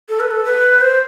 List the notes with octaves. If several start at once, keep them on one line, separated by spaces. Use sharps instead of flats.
A4
B4
A4
B4
C5